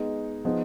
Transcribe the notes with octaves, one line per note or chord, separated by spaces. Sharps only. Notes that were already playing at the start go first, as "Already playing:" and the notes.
Already playing: G#3 B3 D#4
F3 B3 D#4 G#4